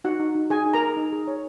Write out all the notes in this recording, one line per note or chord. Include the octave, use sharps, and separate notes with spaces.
D#4 F#4 F#5
D#4
D#4
D#4 G#4 G#5
D#4
A#4 A#5
G#4
D#4
G#4
C#5